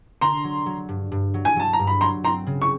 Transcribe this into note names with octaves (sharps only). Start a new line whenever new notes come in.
D3 A#5 C6
F#3
F#3
G2
G2
F#3
G#5
F#3 A5
A#5
G2
B5
F#3 A#5 C6
C4 A#5 C6
C#3
C#6